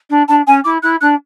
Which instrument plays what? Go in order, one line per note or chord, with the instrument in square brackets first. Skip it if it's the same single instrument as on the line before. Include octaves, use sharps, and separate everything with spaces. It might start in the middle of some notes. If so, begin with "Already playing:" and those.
[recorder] D4
[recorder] D4 [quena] A5
[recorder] C#4 [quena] G#5
[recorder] E4 [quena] D6
[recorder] E4 [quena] F#6
[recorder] D4 [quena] F#6